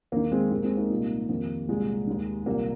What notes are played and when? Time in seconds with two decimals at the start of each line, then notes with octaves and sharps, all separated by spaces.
0.12 D#2 D#3 A#3
0.31 G#3 C4
0.51 D#2 D#3 A#3
0.64 G#3 C4
0.77 A#3 D#4
0.90 C2 A#2
1.29 F2 D#3 A#3
1.68 C2 A#2 G#3
2.07 D#2 D#3
2.46 C2 A#2 A#3